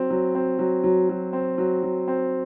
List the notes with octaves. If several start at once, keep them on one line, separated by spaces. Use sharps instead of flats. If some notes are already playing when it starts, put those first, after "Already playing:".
Already playing: F#3 C4
F#3
C4
F#3
F#3
F#3
C4
F#3
F#3
C4